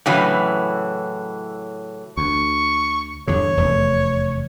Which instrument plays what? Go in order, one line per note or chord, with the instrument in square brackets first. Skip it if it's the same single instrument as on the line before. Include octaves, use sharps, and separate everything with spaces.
[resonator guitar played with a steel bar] A2 C#3 E3 F#3
[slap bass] D2 [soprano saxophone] C#6
[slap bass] E2 G2 D3 [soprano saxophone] C#5
[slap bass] F1 E2 A3